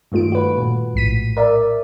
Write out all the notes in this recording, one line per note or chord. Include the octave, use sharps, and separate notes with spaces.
G2 D#3 A3 F4 D7
F#4 B4
A#2
A#1 A2 B6 D#7
A#4 D5 E5